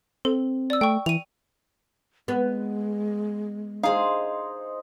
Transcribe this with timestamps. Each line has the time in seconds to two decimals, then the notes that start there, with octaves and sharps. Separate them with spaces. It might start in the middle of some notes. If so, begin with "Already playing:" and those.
0.25 C4 A4
0.70 D5 E6
0.81 A3 G5 C#6
1.06 E3 D#7 F7
2.28 G#3 B3
3.83 D#4 G#4 C5 F5